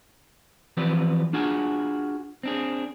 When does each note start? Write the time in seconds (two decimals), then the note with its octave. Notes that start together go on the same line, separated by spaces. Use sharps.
0.77 E3 F3 C4 G4 B4 D5
1.33 D4 F4 F#4 G#4 G#5
2.43 C4 D4 G#4